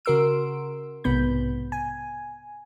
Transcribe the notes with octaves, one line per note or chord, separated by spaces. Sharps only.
C#3 F#4 A#4 C6 E6 D7
B1 G#2 C3 B3 B5 G6
G#5